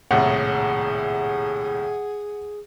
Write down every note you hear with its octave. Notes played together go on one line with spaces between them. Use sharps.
D#1 C2 A2 G#4 F#5